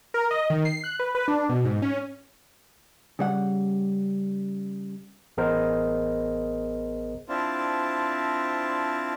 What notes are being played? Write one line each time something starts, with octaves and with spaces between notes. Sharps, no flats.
A#4
D#5
D#3
C7
F#6
B4
B4
D4
B2
G#2
C#4
C#3 G3 F#5
A1 B3 G#4 A#4 C5 D#5
C4 D4 E4 F4 A5